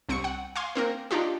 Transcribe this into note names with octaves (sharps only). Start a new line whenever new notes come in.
C2 C4 C#6 C#7
F#5
F5 G#5 C6
A#3 C4 A#4
D4 D#4 F4 G4